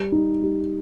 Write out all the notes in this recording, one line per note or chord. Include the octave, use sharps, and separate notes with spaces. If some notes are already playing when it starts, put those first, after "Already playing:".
Already playing: G3
D#4
G3